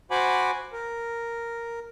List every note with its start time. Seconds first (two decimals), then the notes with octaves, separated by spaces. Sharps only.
0.11 F#4 C5 F#5 G#5 B5 D6
0.73 A#4